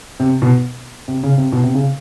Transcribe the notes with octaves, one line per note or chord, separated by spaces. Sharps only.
C3
B2
C3
C#3
C3
B2
C3
C#3